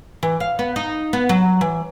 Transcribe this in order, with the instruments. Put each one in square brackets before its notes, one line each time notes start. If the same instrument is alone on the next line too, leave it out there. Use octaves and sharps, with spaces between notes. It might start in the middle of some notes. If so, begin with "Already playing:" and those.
[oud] E3
F5
B3
D#4
B3
F#3
E3